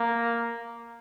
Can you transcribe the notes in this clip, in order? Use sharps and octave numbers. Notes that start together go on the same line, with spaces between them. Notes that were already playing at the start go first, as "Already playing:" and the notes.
Already playing: A#3